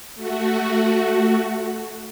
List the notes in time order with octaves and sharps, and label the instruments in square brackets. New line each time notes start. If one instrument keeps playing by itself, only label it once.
[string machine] A3 F#4